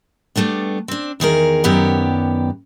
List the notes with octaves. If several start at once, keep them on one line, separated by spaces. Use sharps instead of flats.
G3 A3 B3 D4
C4 D4
E2 D#3 G#4 A#4
F#2 D#3 B3 G4 D5